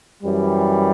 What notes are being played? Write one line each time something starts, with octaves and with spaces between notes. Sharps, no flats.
F#2 E3 G3